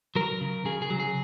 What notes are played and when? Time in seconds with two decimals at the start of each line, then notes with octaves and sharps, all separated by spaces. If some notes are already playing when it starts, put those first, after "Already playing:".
0.15 F#3 A#4
0.41 C#3
0.65 C#3 G#4
0.82 G#4
0.90 F#3
1.00 G#4